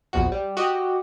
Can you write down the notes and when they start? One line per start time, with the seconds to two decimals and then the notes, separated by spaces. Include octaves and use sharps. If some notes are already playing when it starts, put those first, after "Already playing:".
0.13 A#1 E2 F3 F#4
0.32 G3
0.57 F#4 G4 D#5